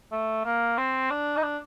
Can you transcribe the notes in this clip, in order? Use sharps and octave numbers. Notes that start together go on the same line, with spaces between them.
A3
A#3
C4
D4
D#4
D4